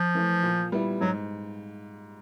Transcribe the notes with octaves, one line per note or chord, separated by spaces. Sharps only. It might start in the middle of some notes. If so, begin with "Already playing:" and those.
Already playing: F3
E3 A3
A#2
G3 B3 E4
G#2 F#3